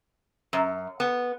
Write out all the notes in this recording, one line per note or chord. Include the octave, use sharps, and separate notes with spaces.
F#2
B3